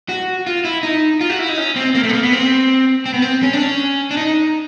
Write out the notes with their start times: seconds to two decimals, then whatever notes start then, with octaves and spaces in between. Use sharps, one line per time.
0.09 F#4
0.47 F4
0.65 E4
0.83 D#4
1.21 F4
1.30 F#4
1.39 E4
1.49 D#4
1.58 C#4
1.76 C4
1.95 A#3
2.03 A3
2.09 B3
2.13 A#3
2.23 B3
2.32 C4
3.06 C4
3.14 B3
3.22 C4
3.43 C#4
3.53 D4
3.62 C#4
4.11 D4
4.17 D#4